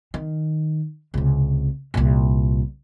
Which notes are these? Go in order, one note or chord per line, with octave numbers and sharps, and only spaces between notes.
D#3
C#2 C3
C2 A#2